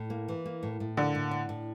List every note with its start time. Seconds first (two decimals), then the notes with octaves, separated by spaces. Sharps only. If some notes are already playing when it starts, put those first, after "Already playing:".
Already playing: A2
0.10 A#3
0.28 E3
0.46 A#3
0.63 A2
0.80 A2
0.97 D3 A#3
1.15 A2
1.31 D4
1.49 A2